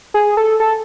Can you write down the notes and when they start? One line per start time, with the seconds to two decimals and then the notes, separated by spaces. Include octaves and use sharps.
0.14 G#4
0.37 A4
0.60 A4